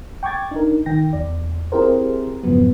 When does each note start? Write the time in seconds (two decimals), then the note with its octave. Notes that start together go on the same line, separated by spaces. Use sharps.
0.23 G5 C#6 D6 G#6 A6
0.51 D4 D#4 A#4
0.86 D#3 G5 A#6
1.13 E2 D5
1.72 C4 E4 G4 G#4 A#4 C5
2.43 F2 G#2 C#3 F3 F#3 B3